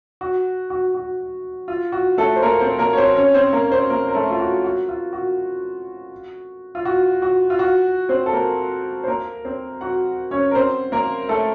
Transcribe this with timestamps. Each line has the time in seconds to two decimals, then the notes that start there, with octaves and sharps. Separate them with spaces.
0.21 F#4
0.70 F#4
0.94 F#4
1.68 F4
1.92 F#4
2.18 A3 A4
2.36 C5
2.42 A#3 A#4
2.61 C4 C5
2.79 A#3 A#4
2.93 C#5
2.98 C4 C5
3.16 C#4 C#5
3.34 C4 C5
3.53 A#3 A#4
3.71 C4 C5
3.90 A#3 A#4
4.08 A#4
4.15 A3 A4
4.30 F4
4.40 F#4
4.64 F#4
4.89 F4
5.13 F#4
6.75 F4
6.85 F#4
7.22 F#4
7.50 F4
7.59 F#4
8.09 C4 C5
8.26 A4
8.33 A#3 A#4
9.04 C5
9.07 A#3 A#4
9.45 C4 C5
9.81 F#4 F#5
10.31 C#4 C#5
10.51 A#4
10.55 C4 C5
10.92 A#3 A#4
11.29 A3 A4